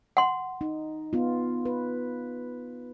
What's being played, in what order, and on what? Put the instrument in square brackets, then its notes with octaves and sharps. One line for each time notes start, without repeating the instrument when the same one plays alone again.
[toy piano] F#5 C6
[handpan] D#4
B3 F4
B4